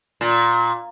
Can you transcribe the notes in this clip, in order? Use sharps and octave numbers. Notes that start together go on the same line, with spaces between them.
A#2